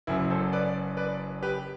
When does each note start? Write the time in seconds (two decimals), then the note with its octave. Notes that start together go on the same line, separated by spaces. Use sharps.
0.07 F#1 F#2 F#3 E4
0.30 A4 C5
0.53 B4 D5
0.97 B4 D5
1.42 G4 B4